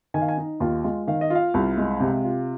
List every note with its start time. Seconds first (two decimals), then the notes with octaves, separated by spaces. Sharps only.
0.14 D#3 G#5
0.22 F5
0.29 G#5
0.38 D#4
0.60 D#2 F4
0.84 G#3 F4
1.07 D#3 F5
1.21 D#5
1.30 F4 F5
1.54 C2
1.77 G#3
2.00 C3
2.24 F4